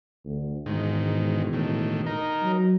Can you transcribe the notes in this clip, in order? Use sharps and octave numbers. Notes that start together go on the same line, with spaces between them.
D2
E1 G#2 D#3
A2 D#3
D#4 A#4
F#3